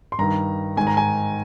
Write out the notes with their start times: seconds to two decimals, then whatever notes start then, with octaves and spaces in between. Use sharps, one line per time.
0.12 C6
0.19 G2 D#3 A#5
0.77 G#2 D#3 G#5
0.87 A#5
0.97 G#5